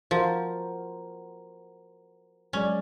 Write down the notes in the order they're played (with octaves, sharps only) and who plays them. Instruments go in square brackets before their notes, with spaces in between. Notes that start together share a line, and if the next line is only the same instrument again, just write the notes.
[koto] F3 [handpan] F#4 A#4 C5
[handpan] F#3 G#3 D5 [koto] C#4